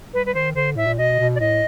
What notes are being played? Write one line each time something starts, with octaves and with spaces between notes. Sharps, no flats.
G3 B4
B4
D#3 C5
D3 C5
A2 E5
A#2
B2 D#5
B2
D5
A2 D#5